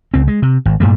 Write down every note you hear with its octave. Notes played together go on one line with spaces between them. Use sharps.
C#2 C4
G#3
C3
G#1
G2 A#2 G3 A3